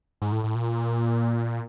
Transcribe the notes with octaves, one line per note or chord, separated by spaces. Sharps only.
G#2
A2
A2
A#2